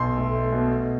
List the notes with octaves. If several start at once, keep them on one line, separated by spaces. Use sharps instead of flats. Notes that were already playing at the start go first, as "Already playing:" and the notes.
Already playing: B1 C6
A3
B2